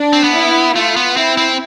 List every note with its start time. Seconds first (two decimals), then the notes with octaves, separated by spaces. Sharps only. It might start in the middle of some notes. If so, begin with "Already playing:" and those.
Already playing: D4
0.13 C4
0.24 B3
0.34 E4
0.76 A3 F4
0.96 B3
1.17 C4 E4
1.37 C4